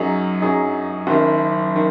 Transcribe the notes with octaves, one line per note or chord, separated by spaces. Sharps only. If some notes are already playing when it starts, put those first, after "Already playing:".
Already playing: F#2 F#3 D#4 G#4
F#2 F#3 D#4 G#4
F#1 F#2 D#3
D#3